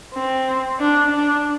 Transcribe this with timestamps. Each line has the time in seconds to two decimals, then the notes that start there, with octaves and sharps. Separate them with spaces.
0.15 C4
0.79 D4
1.10 D4